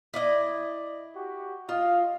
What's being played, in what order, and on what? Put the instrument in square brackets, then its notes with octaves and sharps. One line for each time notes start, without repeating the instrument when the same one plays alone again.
[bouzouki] E4 D5 D#5
[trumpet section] F#4 G4
[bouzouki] F4 [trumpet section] D#5 F5